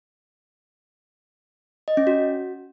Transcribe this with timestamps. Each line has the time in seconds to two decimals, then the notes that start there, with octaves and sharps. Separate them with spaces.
1.88 D#5
1.97 C#4
2.07 F#4